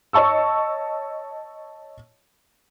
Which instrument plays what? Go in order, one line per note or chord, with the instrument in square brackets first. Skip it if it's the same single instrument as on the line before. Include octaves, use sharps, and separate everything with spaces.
[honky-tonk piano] C#5 D#5 A5 C#6 E6